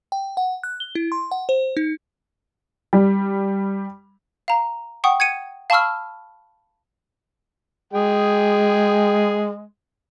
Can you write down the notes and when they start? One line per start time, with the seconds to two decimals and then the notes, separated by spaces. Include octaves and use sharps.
0.12 G5
0.37 F#5
0.63 F#6
0.80 G7
0.95 E4
1.12 C6
1.31 F#5
1.49 C5
1.77 D#4
2.93 G3
4.48 F5 A#5
5.04 F#5 G5 C#6 D#6
5.20 G#6 C#7 D#7
5.70 F5 A5 B5 C#6 E6 F6
7.94 G#3 G#4 G5